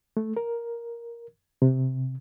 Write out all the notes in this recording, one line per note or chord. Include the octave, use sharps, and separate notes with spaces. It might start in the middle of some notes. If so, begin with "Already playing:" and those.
A3
A#4
C3